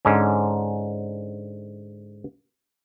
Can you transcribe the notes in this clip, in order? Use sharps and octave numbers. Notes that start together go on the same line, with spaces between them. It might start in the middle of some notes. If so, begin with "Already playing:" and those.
G#2 D3 C#4